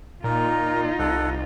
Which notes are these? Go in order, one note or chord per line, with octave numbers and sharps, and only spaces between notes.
A#2 D#4 F4 A#4
C2 A4 F#5